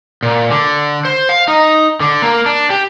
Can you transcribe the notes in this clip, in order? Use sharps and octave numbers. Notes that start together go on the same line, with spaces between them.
A#2
D3
C5
F5
D#4
D3
A#3
D4
G4